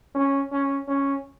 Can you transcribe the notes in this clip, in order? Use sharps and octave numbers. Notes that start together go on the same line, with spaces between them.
C#4
C#4
C#4